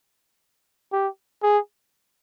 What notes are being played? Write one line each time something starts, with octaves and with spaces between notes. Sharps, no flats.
G4
G#4